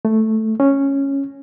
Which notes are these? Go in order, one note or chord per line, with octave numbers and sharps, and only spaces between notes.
A3
C#4